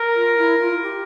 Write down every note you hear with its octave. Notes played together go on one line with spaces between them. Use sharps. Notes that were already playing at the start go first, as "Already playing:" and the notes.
Already playing: A#4
F4
E4
F4
G4